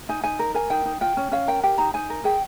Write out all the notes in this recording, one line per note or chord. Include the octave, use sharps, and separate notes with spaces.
D#4 G#5
D#4 G#5
A#4
A#4 G#5
D#4 G5
D#4
F4 G5
C#4
C#4 F5
A#4 G5
G4 G5
D#4 A#5
D#4 G#5
A#4
G#4 G5